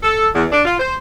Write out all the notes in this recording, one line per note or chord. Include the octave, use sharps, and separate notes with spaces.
A4
E2
D4
F4
C5